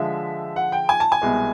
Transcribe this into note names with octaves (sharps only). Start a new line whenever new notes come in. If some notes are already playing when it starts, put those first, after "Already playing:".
Already playing: D3 F3 G#3 E5
F#5
G5
G#5
A5
G#5
C2 B2 G#3